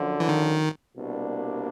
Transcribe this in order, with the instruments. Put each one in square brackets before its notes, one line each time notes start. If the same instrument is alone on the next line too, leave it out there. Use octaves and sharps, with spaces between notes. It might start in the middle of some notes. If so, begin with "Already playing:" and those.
Already playing: [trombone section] F#2 D3 F3
[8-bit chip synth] E3
D#3
[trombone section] C2 B2 G3 A#3 D4